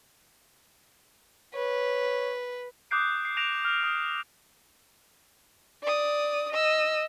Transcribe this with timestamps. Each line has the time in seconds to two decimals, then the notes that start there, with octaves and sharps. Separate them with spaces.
1.55 B4 C#5
2.91 D6 D#6 F#6 G6 C7 D7
3.25 C7
3.37 F#6 A#6 D7 E7 F7
3.65 F6
3.83 D#6
5.83 D5 D#6
6.53 D#5 E6